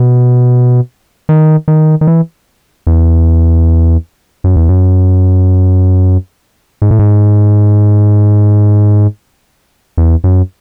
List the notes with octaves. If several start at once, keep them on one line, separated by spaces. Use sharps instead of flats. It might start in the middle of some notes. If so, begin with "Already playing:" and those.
Already playing: B2
D#3
D#3
D#3
E3
E2
F#2
E2
F#2
G#2
A2
G#2
E2
F#2